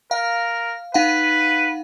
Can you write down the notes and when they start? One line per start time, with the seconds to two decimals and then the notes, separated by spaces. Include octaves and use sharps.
0.11 A#4 F5
0.94 D#4 B4 F5 F#5